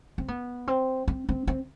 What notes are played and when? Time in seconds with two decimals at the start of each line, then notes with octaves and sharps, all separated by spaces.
0.18 C4
0.28 B3
0.68 C4
1.08 C4
1.29 C4
1.47 C4